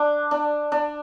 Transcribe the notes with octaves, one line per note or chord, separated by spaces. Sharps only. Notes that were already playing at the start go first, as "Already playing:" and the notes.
Already playing: D4
D4
D4